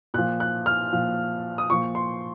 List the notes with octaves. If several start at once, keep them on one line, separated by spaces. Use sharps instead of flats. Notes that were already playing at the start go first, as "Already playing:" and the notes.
A#2 F3 F#6
F#6
F6
A#2 F3
D#6
A#2 F3 C#6
C6